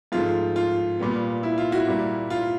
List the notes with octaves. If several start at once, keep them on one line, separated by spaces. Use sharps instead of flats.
G#2 F3 A3 F4
F4
A#2 G3 B3
E4
F4
E4 F#4
A#2 G3 A#3
F4